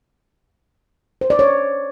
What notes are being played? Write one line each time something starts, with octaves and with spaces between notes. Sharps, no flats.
C5
D5
C#5